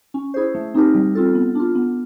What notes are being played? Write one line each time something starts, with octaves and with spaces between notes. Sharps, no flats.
C#4
E4 G#4 C5
A3
C4 D#4 G4 A#4
G3
C4 F4 A4
B3
D4 F4
B3